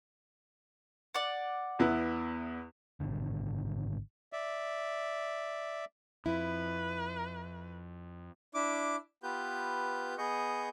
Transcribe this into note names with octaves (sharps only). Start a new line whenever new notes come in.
D5 F#5
E2 B3 E4
G#1 B2 D3
D5 E5
F2 E4 B4
D4 E4 D6
B3 F4 G4 B4 G6
B3 G#4 D#5 C#6 G6